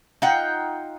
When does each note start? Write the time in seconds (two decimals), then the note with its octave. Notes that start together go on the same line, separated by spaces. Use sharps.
0.22 D#4 F4 F#5 G5